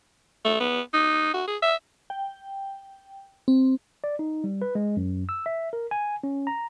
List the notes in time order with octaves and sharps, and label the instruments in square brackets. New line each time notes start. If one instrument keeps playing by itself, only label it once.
[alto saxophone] A3
B3
D#4
F#4
G#4
E5
[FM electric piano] G5
C4
[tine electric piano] D5
D#4
G3
B4
G#3
F#2
E6
E5
A#4
G#5
C#4
A#5